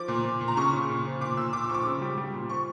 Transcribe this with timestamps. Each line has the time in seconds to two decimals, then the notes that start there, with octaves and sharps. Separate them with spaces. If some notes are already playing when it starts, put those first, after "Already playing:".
Already playing: F3 D6
0.08 A#2
0.25 A#2
0.41 A#2
0.48 A#5
0.57 C#3 C#6
0.73 C#3
0.89 A#2
1.06 F3
1.21 A#2 D6
1.37 A#2 E6
1.53 A#2 D6
1.64 E6
1.69 F3 C#6
1.74 D6
1.85 C#3
2.01 G3
2.18 G3
2.33 A#2
2.49 F3 C#6